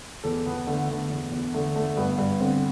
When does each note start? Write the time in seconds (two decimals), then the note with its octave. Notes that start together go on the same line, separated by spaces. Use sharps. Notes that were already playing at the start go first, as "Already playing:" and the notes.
0.24 E2 A4
0.46 E2 B3
0.67 D3 A3
0.89 D3
1.10 E2
1.32 E2
1.54 D3 A3
1.76 D3 A3
1.96 G2 B3
2.18 G2
2.40 D3 C4